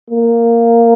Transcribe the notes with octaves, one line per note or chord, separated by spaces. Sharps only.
A#3